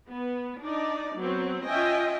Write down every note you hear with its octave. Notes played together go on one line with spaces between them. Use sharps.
B3
D4 D#4 D5
F#3 B3 C4
C#4 F4 D#5 E5 G5 G#5